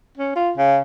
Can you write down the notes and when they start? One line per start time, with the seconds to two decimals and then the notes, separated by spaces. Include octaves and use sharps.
0.17 C#4
0.36 F4
0.57 C#3